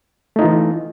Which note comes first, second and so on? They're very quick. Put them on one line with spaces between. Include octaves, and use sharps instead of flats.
A3 D#4 F4 E3